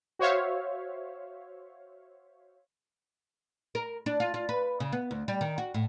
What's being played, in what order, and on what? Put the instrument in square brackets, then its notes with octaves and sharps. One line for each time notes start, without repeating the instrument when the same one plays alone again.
[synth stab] F#4 C5 C#5 E5 F5
[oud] A#4
D4
F4
F4
B4
C#3
B3
D2
G3
D#3
F#4
A2